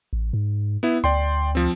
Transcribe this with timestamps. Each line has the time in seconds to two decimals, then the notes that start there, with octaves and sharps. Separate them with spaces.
0.13 A1
0.33 G#2
0.83 B3 E4
1.04 D2 D5 G5 C6
1.55 F3 C4